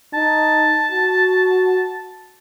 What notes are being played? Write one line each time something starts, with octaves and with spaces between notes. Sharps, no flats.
D#4 A5
F#4